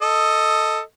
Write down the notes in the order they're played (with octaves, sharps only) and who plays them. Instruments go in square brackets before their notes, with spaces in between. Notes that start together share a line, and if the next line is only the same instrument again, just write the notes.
[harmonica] A4 D#5